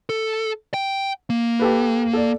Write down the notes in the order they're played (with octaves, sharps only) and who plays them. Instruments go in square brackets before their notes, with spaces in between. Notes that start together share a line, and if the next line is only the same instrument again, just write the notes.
[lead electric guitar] A4
G5
A#3
[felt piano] G4 A4 B4
A4 D5